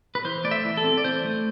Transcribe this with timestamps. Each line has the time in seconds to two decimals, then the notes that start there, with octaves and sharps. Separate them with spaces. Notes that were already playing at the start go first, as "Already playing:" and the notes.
0.15 B4
0.25 E3 C5
0.44 A3 D5
0.51 E5
0.64 E3
0.77 A4
0.84 C4
0.98 D5
1.04 E3 C5
1.25 A3